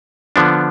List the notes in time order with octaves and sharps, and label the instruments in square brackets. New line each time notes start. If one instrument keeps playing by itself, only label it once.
[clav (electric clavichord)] D3 F3 B3 D4